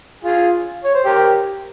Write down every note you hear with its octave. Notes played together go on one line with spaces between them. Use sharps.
F4 G#4
C#5
C5
G4 A#4